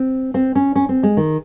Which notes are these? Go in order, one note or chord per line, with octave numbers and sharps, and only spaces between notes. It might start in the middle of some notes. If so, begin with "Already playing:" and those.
Already playing: C4
C4
C#4
C#4
C4
G#3
D#3